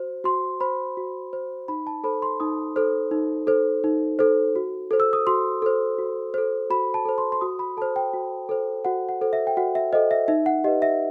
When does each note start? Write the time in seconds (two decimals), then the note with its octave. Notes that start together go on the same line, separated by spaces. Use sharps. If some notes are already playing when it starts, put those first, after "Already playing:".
Already playing: F#4 C5
0.24 F#4 C6
0.60 C5 B5
0.97 F#4
1.33 C5
1.68 D#4 B5
1.87 A5
2.04 A4 C5 B5
2.22 C6
2.40 D#4 D#6
2.76 A4 C5
3.11 D#4
3.47 A4 C5
3.84 D#4
4.19 A4 C5
4.56 F#4
4.91 A4 C5
5.00 E6
5.13 D#6
5.27 F#4 C6
5.62 A4 C5
5.98 F#4
6.34 A4 C5
6.70 F#4 B5
6.94 A5
7.05 A4 C5
7.18 C6
7.32 C6
7.41 F#4 D#6
7.59 B5
7.77 A4 C5 A5
7.96 G5
8.14 F#4
8.49 A4 C5
8.85 F#4 F#5
9.09 F#5
9.22 A4 C5
9.33 E5
9.47 G5
9.57 F#4 F#5
9.75 E5
9.93 A4 C5 D#5
10.11 E5
10.28 D#4 E5
10.46 F#5
10.64 G4 B4 D#5
10.82 E5